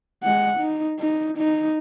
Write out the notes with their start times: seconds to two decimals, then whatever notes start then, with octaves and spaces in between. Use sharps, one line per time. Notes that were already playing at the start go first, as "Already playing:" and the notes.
0.23 G#3 F#5
0.60 D#4
1.00 D#4
1.38 D#4